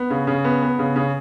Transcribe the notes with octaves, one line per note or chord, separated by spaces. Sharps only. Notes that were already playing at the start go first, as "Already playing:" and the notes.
Already playing: B3
C#3
C#3
B3
B3
C#3
C#3